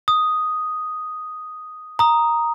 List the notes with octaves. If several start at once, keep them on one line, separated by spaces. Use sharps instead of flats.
D#6
A#5 D#6